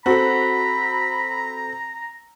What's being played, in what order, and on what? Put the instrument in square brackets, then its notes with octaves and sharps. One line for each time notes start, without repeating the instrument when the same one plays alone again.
[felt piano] C4 A4 [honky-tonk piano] F#4 [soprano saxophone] A#5 [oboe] B5